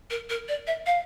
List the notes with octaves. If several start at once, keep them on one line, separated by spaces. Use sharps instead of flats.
A#4
A#4
D5
E5
F5